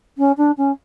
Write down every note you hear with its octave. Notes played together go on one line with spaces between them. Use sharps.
C#4
D4
C#4